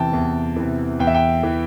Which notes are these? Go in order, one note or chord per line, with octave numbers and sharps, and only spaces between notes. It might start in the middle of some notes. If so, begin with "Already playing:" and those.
Already playing: E2 C3 E3 G5 A5
E2
C3 E3
E2 G5
E5
G5
E3